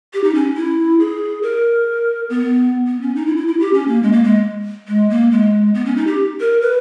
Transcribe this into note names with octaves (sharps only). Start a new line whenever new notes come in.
G4
D#4
C#4
E4
G#4
A#4
B3
B3
C#4
D#4
E4
E4
E4
G4
C#4
A#3
G#3
A#3
G#3
G#3
A#3
G#3
B3
C#4
D#4
G4
A#4
B4